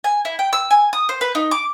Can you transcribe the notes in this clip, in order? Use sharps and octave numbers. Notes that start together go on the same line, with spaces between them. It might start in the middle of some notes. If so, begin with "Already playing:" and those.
G#5
E4
G5
E6
G#5
D#6
C5
B4
D#4
D6